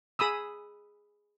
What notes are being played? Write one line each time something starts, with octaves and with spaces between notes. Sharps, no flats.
G#4 B5 D#6 E6